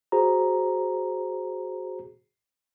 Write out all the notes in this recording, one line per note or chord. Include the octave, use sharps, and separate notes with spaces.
F#4 G#4 C5 A#5